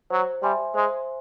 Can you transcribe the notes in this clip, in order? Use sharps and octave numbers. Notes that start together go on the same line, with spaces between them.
F#3 C5
G3 E5 G#5 C6
G#3 C5